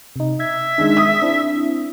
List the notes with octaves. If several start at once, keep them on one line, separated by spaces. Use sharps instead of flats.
C3 D#4
E5 G#6
D#3 G#3 D4
D#6
C4 D4 E4